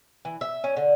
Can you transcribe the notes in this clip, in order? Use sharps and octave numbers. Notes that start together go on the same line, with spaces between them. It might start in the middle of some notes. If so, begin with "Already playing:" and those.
E3
E5
C#4
D3